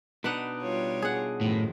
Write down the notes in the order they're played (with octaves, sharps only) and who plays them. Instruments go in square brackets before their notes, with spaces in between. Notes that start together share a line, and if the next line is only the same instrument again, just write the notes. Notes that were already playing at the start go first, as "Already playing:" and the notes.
[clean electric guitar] B2 D4 D#4 [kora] B4 F#5
[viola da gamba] G3 F4 C#5
[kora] G#4 F#5
[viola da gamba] F#2 D#3 F3 [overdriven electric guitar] A2